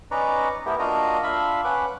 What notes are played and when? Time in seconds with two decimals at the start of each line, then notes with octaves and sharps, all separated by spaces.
0.11 C#4 D#4 B4 D5 A#5 C#6
0.66 A3 B3 E4 G4 A#4
0.79 A#3 D4 F4 F#4 D#5 A#5
1.23 D4 F4 E5 F5 B5
1.64 C#4 B4 F#5 D6